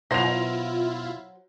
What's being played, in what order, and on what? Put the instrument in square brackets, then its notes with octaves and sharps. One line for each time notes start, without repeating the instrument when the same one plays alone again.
[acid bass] B2 [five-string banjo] F#3 C5 [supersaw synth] E4 F4 [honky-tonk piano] A#6 F7